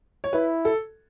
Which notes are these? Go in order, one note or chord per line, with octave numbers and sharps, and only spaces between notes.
C#5
E4 B4
A4